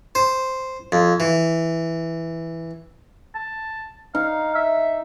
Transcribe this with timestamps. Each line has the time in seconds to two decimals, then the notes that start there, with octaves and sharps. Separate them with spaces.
0.15 C5
0.92 F2
1.20 E3
3.35 A5
4.15 D#4 F5
4.55 E5